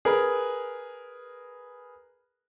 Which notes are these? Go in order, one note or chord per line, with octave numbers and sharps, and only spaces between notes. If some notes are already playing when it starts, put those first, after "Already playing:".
G#4 A#4 B4